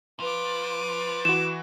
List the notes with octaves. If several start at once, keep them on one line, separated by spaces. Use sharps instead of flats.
F3 B4 D6
E3 F#4 E7